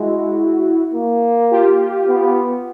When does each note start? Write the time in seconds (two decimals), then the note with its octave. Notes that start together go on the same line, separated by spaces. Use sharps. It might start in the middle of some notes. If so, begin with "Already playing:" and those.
Already playing: G#3 E4 F#4
0.94 A#3
1.51 F4 G4
2.08 B3